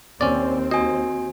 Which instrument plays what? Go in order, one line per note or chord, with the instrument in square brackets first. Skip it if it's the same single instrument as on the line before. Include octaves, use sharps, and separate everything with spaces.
[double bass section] D#2 C4 [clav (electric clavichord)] C#4 D5
[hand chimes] F#4 G#5 [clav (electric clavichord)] D#5